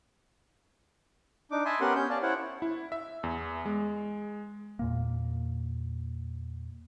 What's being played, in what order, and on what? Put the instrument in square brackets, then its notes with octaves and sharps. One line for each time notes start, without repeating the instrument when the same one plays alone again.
[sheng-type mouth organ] D4 D#4 D6
E5 G#5 A5 B5 C6 D#6
B3 C#4 G4 A#4 F#5 C6
C#4 G6
C#4 D5 F5 A5
E4 C5 C#5 F#5
[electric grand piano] E4
E5
E2
G#3
[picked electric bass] E2 A#2 A#3